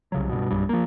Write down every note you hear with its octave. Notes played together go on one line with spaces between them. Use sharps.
C2 C#3 F#3
G2 B2
B1 G2 G3
F3 A#3